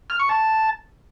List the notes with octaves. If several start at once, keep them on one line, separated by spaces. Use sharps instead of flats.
F6
C#6
A5